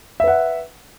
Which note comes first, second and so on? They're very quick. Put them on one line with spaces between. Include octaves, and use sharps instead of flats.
E5 B4 F#5